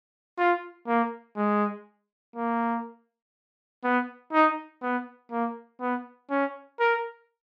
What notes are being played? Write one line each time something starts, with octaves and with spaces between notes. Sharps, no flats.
F4
A#3
G#3
A#3
B3
D#4
B3
A#3
B3
C#4
A#4